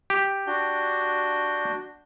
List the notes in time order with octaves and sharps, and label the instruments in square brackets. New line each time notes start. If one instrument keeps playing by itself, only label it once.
[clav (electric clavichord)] G4
[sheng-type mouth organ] D4 F#4 G6